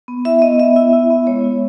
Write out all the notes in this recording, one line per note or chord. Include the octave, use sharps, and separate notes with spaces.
B3
E4 E5
B3 D#5
B3 E5
E4 E5
E4
B3
G#3 C#5
E4